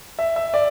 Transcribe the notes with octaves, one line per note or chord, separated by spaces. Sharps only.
E5
E5
D5